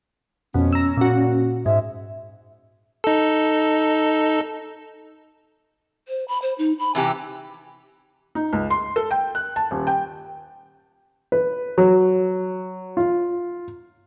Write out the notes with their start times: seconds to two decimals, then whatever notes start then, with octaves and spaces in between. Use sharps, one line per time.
0.54 F2 B2 C#4
0.73 A#5 E6
0.97 A#2 F#4
1.66 G#2 E5
3.04 D#4 A4
6.08 C5
6.28 B5
6.42 C5
6.58 D#4
6.79 B5
6.95 C3 E3 G4 G#5
8.35 D#4
8.53 C#2
8.70 C6
8.96 A4
9.11 G5
9.35 F#6
9.56 A5
9.71 D#1
9.87 G5
11.32 B4
11.78 F#3
12.97 F4